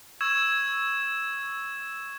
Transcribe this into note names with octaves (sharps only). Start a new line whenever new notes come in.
C#6 E6 G#6 E7